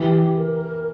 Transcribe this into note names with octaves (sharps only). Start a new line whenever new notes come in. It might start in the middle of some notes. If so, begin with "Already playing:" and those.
Already playing: E3 G4
A#4